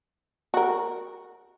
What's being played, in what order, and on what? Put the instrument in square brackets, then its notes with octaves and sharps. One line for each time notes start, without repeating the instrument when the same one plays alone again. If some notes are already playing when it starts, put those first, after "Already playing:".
[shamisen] F#4 A#4